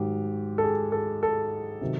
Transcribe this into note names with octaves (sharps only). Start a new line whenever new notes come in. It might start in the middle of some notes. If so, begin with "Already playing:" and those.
Already playing: G#2 D#3 F#3 G4
A4
G#4
A4
A4
C3 D#3 F#3